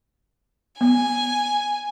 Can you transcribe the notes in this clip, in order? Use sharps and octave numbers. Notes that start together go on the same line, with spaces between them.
B3 G#5